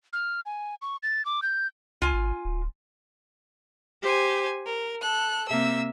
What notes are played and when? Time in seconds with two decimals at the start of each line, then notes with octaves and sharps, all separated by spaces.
0.13 F6
0.46 G#5
0.82 C#6
1.03 A6
1.25 D6
1.42 G6
2.02 C#2 F4 G#5
2.13 G#1
2.45 D1
4.02 G4 C5 G#5
4.66 A#4
5.00 A4 F#6
5.47 C3 A#3 E5 E6